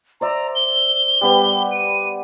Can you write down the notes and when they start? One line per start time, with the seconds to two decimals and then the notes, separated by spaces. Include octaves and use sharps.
0.21 C5 D5 E5 A#5
0.55 G7
1.21 G3 B3 G4
1.72 D#7